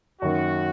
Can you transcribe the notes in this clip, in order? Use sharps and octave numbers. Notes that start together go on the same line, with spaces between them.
F#2 D#3 A#3 F#4